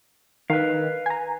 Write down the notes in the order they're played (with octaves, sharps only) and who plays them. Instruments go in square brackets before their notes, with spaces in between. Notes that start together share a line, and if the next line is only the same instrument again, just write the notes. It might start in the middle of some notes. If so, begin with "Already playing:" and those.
[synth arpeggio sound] D#3 [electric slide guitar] B4 F5
[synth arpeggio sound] G#5 A#5